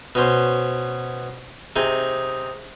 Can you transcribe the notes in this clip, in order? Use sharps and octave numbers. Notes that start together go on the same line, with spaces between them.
B2 C#4 C5
C3 D#4 G#4